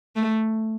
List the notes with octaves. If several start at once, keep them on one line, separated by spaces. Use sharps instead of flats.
A3